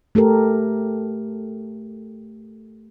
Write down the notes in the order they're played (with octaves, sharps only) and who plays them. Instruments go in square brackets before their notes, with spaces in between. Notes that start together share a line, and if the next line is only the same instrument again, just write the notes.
[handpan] A3 G4 A4 A#4